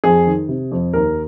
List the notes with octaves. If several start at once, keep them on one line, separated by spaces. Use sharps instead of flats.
F2 G#4
D#3
C3
F2
D#2 A#4